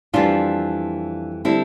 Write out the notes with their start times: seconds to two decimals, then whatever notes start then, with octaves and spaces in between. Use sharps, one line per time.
0.13 F2 E3 G3 D4 F4
1.45 D3 G3 C4 E4